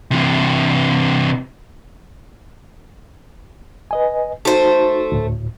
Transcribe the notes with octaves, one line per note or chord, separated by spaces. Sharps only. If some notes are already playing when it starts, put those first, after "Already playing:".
C3 E3
B4 D#5 G#5
A3 D#4 F#4 C5 A5
D2 A2